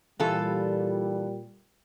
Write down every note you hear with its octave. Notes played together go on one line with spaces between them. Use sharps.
A#2 E3 G3 F4 A4